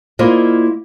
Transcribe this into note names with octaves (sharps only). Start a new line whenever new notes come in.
A#3 E4 F4 C5 D5 D#5